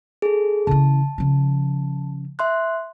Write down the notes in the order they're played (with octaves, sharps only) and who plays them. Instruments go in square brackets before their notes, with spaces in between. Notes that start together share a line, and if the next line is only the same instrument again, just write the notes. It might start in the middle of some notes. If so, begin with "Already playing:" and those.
[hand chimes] G#4 A4
[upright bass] C#3 E3 [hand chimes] A5
[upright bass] C#3 F3
[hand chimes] E5 C6 F#6